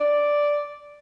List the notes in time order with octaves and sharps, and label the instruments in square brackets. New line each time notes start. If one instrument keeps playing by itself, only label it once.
[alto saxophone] D5